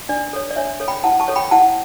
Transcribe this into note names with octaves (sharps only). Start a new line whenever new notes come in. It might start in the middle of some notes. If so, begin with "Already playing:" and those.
D4 D5
A4 C#5
D5
D4 C#5 E5
A4 C#5
G5 B5
E4 F#5 A5
A5 C#6
A4 C#5
G5 B5
E4 F#5 A5